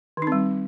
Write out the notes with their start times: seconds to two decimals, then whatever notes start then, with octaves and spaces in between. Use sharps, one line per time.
0.17 D#3
0.22 D#4
0.27 C4
0.32 G3